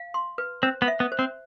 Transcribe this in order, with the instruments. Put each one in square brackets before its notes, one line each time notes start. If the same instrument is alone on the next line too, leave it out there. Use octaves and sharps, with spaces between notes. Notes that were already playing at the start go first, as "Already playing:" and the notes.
Already playing: [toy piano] F5
C6
B4
[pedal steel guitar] C4 [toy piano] C5
[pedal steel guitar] B3
[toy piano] E5
[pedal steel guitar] B3
[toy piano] C5
[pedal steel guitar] C4